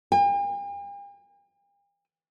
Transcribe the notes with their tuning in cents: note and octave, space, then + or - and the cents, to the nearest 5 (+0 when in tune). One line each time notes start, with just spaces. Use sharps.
G5 +45